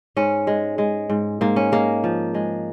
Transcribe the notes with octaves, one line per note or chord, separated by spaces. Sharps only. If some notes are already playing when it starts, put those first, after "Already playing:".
G#2 C#4
G#3
G#3
G#2
G#2 A#3
C#4
G#3 A#3
F3
G#3